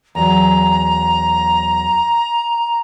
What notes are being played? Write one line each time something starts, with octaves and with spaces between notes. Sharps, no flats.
E2 F#3 A#5